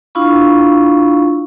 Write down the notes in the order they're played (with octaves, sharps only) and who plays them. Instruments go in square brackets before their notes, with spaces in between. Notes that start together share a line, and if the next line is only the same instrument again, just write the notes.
[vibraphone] D4 E4 F4 F5 B5 C#6